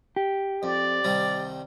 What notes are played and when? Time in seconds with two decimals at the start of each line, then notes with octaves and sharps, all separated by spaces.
0.16 G4
0.63 F2 D5
1.04 C2 D#3 G3